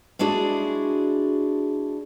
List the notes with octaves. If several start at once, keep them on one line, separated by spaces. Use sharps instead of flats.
G#3 D4 E4 F#4 G#4 D5